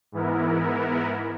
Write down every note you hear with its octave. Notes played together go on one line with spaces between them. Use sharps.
G#2 E3 B3 E4 A#4